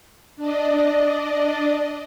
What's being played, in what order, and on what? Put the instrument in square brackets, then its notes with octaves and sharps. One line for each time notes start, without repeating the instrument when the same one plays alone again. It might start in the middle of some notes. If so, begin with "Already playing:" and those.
[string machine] D4 D5 D#5